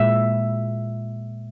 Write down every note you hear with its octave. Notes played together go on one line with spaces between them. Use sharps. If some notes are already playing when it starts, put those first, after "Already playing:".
Already playing: A#2 G#3 E5